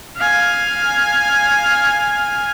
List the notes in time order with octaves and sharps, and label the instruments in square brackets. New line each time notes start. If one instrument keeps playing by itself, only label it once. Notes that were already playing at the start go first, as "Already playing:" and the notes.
[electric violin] F5 G#5